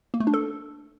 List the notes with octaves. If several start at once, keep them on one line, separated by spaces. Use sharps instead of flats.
A#3
A3
D4
A4